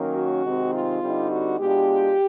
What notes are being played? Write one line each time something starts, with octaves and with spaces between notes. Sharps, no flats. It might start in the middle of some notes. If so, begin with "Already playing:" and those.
Already playing: D#3 F#3 A#3 C#4
F#4
C3 D#3 G#3 C4 D#4
F4
D3 G3 C4 D#4
F#4
B2 G#3 B3 D4 F4 G4